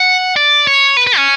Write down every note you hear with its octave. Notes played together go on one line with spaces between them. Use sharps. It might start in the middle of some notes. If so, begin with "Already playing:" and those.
Already playing: F#5
D5
C#5
B4
B4
C#4